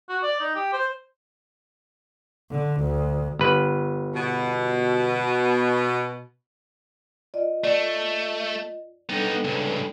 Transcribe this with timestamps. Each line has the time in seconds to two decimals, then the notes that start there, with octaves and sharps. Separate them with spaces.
0.09 F#4
0.23 D5
0.40 D#4
0.55 G4
0.73 C5
2.50 D3
2.81 D2
3.39 G1 B4
4.14 B2
7.34 F4 D5 D#5
7.64 A3 D5
9.09 G3 B3 D4 D#4 A4
9.44 C#2 G2